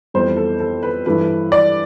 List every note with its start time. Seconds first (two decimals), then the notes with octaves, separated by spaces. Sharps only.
0.14 F2 E3 G3 B3 C5
0.37 A4
0.60 A4
0.83 B4
1.06 G2 E3 A3 B4
1.52 D5